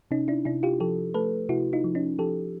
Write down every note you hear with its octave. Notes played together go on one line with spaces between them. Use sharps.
C3 C#4 D#4
D4 E4
C3 D4 E4
F4 G4
F3 G4 A4
A3 A4 B4
C3 E4 F#4
D#4 F4
F3
C#4 D#4
F3 G4 A4